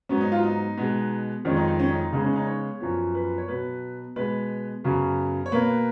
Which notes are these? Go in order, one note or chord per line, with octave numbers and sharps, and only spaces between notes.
G#2 F#3 B3 C#4
D#4
F4
D#4
B2 G#3 B3
F2 D#3 G#3 C#4
D#4
D#4
C#4
D#4
D#4
C#3 G#3 B3 D#4
C#4
D#4
C#5
F#2 F3 B3
B4
C#5
B2 F#3 B3 B4
B2 G#3 B3 B4
F#2 C#3 F#3 B3
C#5
B2 A#3 B4